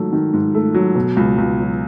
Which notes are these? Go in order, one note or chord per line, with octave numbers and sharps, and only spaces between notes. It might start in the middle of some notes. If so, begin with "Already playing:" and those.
Already playing: G#2 D#3 F#3 A3
D#3
G#2
A3
F#3
B2
C#2
C#2
F#3